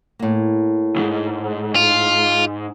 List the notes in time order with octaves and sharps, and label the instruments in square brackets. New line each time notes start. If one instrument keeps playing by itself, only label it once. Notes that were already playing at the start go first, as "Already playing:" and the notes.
[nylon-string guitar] A2 A#3
[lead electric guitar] B1 G#2
[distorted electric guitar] F4